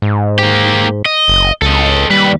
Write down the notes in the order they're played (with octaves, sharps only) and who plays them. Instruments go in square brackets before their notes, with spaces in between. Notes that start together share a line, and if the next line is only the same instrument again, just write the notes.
[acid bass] G#2
[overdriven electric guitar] A#3 G4
D#5
[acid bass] F#1
[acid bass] C#2 [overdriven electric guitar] A4 D#5
[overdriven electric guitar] D#2 B4 [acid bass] G3